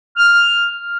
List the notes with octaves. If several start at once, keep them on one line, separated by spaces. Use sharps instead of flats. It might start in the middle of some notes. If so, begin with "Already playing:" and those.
F6